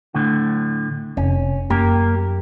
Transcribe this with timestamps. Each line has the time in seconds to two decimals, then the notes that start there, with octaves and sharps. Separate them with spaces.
0.14 D2 A2 D3
1.17 F1 C#4
1.70 F#2 A#3 G4 A#4